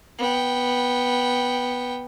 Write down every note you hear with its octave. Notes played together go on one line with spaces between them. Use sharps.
B3 G5